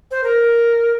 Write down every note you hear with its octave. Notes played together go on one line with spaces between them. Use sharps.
C5
A#4